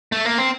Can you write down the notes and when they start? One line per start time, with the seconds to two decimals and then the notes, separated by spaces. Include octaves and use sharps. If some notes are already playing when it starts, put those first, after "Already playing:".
0.12 A3
0.25 A#3
0.38 C4